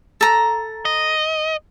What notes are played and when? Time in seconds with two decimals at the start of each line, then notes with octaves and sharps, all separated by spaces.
0.21 A4 A#5
0.85 D#5